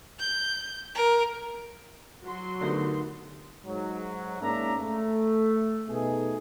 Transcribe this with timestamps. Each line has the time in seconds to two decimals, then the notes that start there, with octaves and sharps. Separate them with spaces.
0.19 G6
0.95 A#4
2.23 F#3 F#4 C6
2.61 D3 A3 B3 D#4 G4 A#4
3.65 G#2 F#3
4.42 G#2 A#3 C#4 D4 E5 A#5
4.80 A3
5.87 B2 A3 D#4 G#4